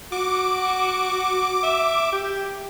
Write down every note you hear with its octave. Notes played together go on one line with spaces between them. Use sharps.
F#4 D6
E5
G4